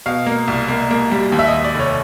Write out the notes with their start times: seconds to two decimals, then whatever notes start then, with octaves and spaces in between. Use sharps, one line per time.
0.06 B2 F5
0.26 A#3
0.48 C2
0.68 A#3
0.91 A#3
1.11 G3
1.32 D#2
1.39 E5
1.48 D#2 D#5
1.64 D5
1.75 F1 C#5